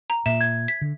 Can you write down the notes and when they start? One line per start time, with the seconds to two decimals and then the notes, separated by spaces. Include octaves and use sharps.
0.10 A#5
0.26 A#2 E5 E7
0.41 G#6
0.68 B6
0.81 D3